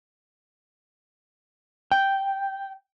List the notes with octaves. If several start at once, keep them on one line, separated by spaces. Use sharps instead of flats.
G5